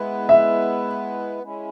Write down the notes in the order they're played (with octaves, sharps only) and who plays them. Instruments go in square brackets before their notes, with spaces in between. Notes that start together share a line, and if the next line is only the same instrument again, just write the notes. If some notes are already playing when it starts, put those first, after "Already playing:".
Already playing: [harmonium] G#3 B3 E4 B4
[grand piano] E5
[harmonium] G#3 C#4 E4